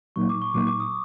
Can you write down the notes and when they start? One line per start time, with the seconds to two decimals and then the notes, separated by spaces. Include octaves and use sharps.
0.16 A#2 F#3 A#3 D#4 C#6
0.29 D6
0.42 C#6
0.54 A#2 F#3 A#3 D#4 D6
0.67 D6
0.80 D#6